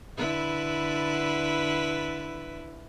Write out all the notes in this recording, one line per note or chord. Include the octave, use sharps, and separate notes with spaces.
D3 E4 B4